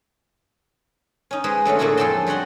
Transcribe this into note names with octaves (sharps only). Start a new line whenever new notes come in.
C#4 D#4
G#3 G#4 B4 C5
D3 F#3 A3 C#4
A2 D3 A#3 F#4 G#4 A4
F2 G#4 A4 G5 A5 C6
G3 F#4 C#5 F#5 C6